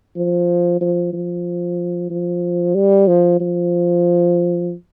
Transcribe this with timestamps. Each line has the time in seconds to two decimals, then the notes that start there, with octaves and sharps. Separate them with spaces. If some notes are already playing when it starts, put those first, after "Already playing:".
0.16 F3
0.81 F3
1.13 F3
2.10 F3
2.75 G3
3.08 F3
3.41 F3